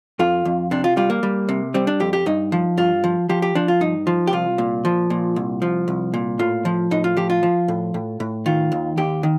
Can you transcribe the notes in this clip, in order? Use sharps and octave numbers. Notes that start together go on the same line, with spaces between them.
F2 F4
F2
C3 D4
F4
G3 F4
A#3
G3
C3
G3 C4
D4
F2 G4
G4
G2 D#4
F3
G2 F4
F3
F3 G4
G4
F3 D4
F4
G2 D#4
F3
G4
C2 F4
A#2
F3
A#2
C2
F3
C2
A#2
A2 F4
F3
A2 D#4
F4
F3 G4
F4
F3
A2
A2
A2
D#3 F4
D#2
D#2 G4
D#3